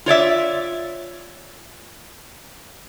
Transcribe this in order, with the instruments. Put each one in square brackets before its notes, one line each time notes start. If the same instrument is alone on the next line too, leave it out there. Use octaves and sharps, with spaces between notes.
[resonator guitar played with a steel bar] F4 C#5 D5 E5